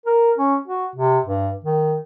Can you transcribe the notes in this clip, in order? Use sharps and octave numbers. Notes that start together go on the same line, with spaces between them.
A#4
C#4
F#4
C3
G2
D#3